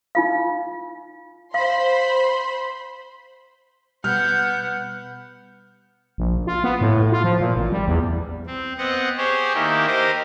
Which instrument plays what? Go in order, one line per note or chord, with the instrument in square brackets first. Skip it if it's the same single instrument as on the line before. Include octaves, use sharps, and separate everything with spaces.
[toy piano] D#4 F4 F5
[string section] C5 B5 C6 [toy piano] F5
[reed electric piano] B2 G3 [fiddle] B3 F#5 [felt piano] F6 [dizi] G6
[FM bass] A#1
F4
B3
A2
F4
F3
A#2
A1
G3
E2
[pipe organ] C4
B3 C4 D#5 F#5
G4 G#4 C5 C#5
D#3 A#3 D#4 E4 G4
G4 A#4 C5 D#5